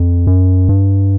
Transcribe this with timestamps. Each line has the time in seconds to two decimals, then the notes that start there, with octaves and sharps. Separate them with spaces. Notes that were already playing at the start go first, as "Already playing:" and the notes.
Already playing: F2
0.27 F#2
0.69 G2